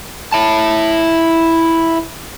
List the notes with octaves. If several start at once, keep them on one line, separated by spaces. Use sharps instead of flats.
E4 A5